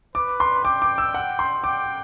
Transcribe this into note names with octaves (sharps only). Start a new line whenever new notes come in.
B4 D6
C6
G5 D6
D6
E6
F#5
C6
G5 D6